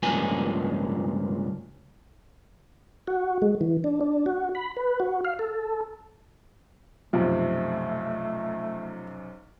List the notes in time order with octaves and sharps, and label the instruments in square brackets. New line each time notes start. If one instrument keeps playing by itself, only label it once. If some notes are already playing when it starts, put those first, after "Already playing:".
[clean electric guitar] C#2 G2 F3 A#3 G#5
[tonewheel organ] F#4
G#3
E3
D4
D4
F#4
B5
B4
F#4
F5
A4
[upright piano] B1 F#2 C3 [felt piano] F3 [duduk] A3